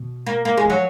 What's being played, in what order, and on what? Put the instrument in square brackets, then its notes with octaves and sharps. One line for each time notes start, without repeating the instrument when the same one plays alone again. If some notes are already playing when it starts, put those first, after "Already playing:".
Already playing: [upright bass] B2
[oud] A#3
A#3
G#3
[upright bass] F3 [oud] F#3